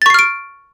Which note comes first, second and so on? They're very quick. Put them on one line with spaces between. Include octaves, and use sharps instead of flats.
A6 C#6 C7 F6 D7